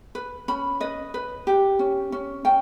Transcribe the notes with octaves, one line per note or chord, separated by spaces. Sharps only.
B4
C#4 B5
B4 D#5
B4
G4
C#4
C#4
C#4 G5